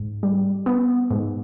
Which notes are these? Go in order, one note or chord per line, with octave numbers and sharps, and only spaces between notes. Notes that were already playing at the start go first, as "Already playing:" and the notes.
Already playing: G#2
G3
B3
G#2